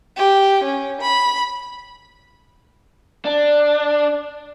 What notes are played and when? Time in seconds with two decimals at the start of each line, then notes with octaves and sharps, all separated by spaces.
0.17 G4
0.64 C#4
1.02 B5
3.25 D4